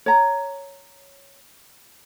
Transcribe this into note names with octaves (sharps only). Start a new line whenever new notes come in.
C#5 A#5